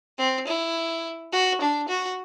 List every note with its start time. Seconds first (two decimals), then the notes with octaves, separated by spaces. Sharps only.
0.18 C4
0.47 E4
1.33 F#4
1.61 D4
1.88 F#4